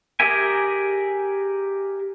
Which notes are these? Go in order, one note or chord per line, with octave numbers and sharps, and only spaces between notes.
G4 G#4 A#4 E5 G#5